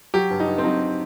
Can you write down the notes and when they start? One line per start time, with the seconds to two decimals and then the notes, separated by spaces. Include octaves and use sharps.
0.14 F#3 G4
0.31 G2
0.40 D#4
0.47 G2
0.58 C4
0.64 F#3 D#4